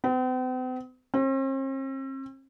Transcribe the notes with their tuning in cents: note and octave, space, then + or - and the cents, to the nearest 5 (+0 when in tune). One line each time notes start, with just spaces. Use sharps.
C4 -45
C4 +45